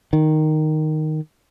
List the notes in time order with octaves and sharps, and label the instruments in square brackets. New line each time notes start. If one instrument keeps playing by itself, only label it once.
[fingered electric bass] D#3